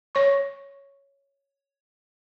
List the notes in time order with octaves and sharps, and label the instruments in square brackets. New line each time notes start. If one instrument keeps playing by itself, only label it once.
[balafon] C#5 C#6